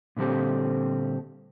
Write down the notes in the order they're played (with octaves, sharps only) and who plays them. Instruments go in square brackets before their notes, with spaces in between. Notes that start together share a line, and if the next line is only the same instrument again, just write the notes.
[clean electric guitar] A#2 D3 G3 C4 A4